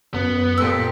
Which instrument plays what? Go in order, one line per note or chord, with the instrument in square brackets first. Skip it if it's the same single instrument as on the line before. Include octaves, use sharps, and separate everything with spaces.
[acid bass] F#2 [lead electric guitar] B3
[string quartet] A#2 G4 A4 [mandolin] E6